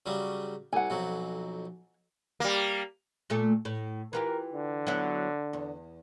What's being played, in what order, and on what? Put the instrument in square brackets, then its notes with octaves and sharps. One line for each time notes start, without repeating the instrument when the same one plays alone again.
[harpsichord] C#3 F#3 G3
[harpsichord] C2 [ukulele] F#5 G#5
[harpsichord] B1 F2 F#3
[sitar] G3 A#3
[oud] A#2 A3 A4
A2
[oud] E3 F4 G4 [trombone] A#4
[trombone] D3
[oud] F#3 B3 E4
E2